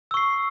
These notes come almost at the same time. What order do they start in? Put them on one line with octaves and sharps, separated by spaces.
E6 C#6 C7